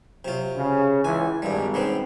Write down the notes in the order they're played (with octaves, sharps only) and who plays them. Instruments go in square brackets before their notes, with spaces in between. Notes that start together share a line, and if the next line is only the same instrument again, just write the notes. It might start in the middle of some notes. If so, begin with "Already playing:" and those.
[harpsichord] C3 F4 [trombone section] F#3
[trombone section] C#3
[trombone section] C#2 E3 [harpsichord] G#5
[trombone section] G#1 [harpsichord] G2 G3
[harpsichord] C#3 B3 C4